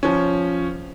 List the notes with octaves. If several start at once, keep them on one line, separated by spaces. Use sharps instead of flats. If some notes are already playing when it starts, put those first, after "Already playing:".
F3 C#4